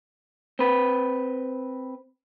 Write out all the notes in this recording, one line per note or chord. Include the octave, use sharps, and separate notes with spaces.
C4 B4